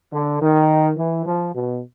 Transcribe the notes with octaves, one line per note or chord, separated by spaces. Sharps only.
D3
D#3
E3
F3
B2